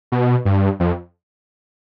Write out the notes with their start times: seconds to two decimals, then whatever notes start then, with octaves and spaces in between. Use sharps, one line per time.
0.12 B2
0.45 G2
0.80 F2